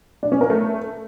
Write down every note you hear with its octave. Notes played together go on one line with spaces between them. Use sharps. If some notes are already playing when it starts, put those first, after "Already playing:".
D4
C#4
A#4
A3